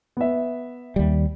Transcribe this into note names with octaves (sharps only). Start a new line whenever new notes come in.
B3 E5
D#2 G3